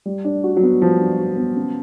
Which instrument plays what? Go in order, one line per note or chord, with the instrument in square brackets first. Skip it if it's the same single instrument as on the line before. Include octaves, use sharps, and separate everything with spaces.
[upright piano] G3
D4
F#4
[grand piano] F#3
[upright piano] B3
[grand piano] F3 [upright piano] G3
[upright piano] D4
F#4
B3
C#3